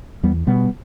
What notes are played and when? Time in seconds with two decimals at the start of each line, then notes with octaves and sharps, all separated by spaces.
0.23 E2 G3 B3
0.47 B2 G3 B3